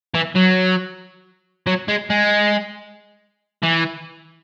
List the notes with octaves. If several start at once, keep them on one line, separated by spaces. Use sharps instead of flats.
E3
F#3
F#3
G#3
G#3
E3